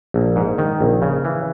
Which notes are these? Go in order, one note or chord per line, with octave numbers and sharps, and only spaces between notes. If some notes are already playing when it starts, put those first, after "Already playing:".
A#1
G#2
D#3
A#1
C#3
E3